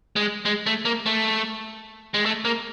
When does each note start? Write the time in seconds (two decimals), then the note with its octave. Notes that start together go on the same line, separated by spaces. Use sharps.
0.16 G#3
0.45 G#3
0.66 A3
0.85 A#3
1.06 A3
2.14 G#3
2.26 A3
2.45 A#3